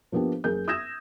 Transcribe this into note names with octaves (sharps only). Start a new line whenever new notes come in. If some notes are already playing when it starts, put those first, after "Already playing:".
F3 A#3 B3 D4 G4
F#1 G#4 A#4 G6
D#6 E6 G6 G#6 A#6 E7